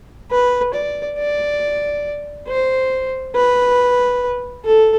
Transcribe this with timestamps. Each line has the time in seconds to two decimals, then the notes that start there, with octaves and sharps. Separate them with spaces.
0.31 B4
0.74 D5
1.18 D5
2.48 C5
3.35 B4
4.65 A4